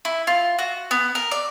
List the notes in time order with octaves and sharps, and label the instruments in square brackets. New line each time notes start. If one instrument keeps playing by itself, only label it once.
[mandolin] E4
F4
F#4
B3
A#4
D5